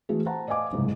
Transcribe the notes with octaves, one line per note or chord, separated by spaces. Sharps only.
E3 A3 F#4 G#4
C5 F#5 A5 A#5
D5 D#5 F5 G#5 D6
F#1 C2 G#2